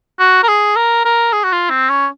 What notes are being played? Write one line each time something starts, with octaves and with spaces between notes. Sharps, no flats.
F#4
A#4
G#4
A#4
A#4
G#4
F#4
F4
C4
C#4